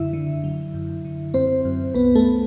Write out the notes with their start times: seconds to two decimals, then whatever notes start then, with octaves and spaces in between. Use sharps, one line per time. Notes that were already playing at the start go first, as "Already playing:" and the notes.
Already playing: F#2 D3 E4 E5
0.13 D3
0.44 F#3
0.74 F#2
1.05 D3
1.34 F#2 C4 C5
1.65 F#2
1.94 C2 B3 B4
2.15 A3 A4